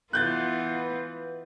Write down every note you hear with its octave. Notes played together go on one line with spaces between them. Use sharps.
E3 B3 F4 F#6 G6 A6